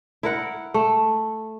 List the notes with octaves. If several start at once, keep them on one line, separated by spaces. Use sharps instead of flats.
E4 A#4 F#5
A3